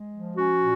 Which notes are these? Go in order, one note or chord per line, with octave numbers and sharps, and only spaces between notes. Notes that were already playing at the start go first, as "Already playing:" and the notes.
Already playing: G#3
F3
C#4 F#4
A#2